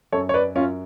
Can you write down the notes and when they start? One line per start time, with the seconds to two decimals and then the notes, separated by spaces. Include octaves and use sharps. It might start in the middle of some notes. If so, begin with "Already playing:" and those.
0.12 F#2 A4 C#5
0.29 C#5
0.34 B4 D5
0.55 F#2 C#4 F4